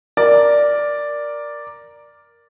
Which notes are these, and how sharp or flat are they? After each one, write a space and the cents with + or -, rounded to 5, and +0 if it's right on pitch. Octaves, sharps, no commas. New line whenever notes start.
A#4 +5 D5 +0